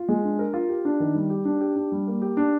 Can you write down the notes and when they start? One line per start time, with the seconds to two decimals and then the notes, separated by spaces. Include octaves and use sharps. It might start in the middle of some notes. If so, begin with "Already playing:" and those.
Already playing: F4
0.09 G#3
0.24 D4
0.39 A#4
0.53 F4
0.69 G4
0.85 D4
1.00 D#3
1.15 G3
1.30 G4
1.45 D4
1.61 G4
1.76 D4
1.92 G3
2.07 A#3
2.22 G4
2.37 D4